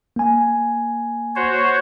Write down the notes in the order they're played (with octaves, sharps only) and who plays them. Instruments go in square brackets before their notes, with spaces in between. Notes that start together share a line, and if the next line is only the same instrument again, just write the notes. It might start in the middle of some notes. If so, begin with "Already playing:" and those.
[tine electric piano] A#3 G#5
[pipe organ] F#4 C5 C#5